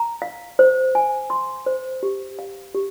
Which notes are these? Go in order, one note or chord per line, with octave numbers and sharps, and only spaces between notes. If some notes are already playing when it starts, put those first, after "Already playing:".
Already playing: A#5
F5
C5
G#5
C6
C5
G4
F5
G4